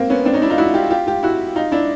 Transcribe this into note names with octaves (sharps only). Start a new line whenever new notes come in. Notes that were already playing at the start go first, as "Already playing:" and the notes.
Already playing: A#3 C4
B3 C#4
C4 D4
C#4 D#4
D4 E4
D#4 F4
E4 F#4
F4 G4
F4 G4
F4 G4
E4 F#4
D#4 F4
D4 E4